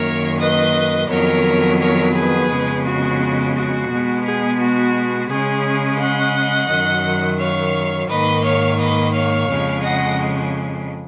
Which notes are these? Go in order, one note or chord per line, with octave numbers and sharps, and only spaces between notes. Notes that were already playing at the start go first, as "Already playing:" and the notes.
Already playing: F#2 D#3 A#3 A#4 C#5
B4 D#5
F2 D#3 F#3 B3 A#4 C#5
A#4 C#5
G#4 B4
F2 C#3 G#3 B3
F#4
F#4
B2 G#3 B3
G#4
F#4
C#3 G#3 C#4 G#4
D#5 F#5
F#2 D#3 F#3
C#5 F5
G#2 D#3 A#3 B4 D#5
C#5 F5
B4 D#5
C#5 F5
F2 C#3 G#3
D#5 F#5